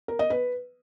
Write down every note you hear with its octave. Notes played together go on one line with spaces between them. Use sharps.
A#4
D#5
B4